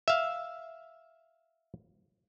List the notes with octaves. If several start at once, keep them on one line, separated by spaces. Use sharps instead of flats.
E5 F5